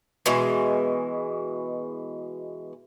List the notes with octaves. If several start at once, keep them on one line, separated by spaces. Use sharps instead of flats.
B2 E3 G#3